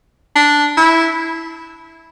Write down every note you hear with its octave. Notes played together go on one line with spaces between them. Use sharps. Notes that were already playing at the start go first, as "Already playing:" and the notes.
D4
E4